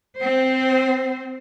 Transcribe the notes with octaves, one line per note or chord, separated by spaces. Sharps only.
C4 C5